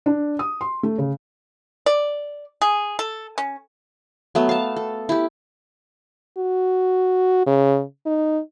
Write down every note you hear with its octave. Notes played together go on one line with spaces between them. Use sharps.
D4
D#6
C6
A3
C#3
D5
G#4
A4
C#4
F#3 A3 B3
F5 A5
A4
E4 G4
F#4
C#3
D#4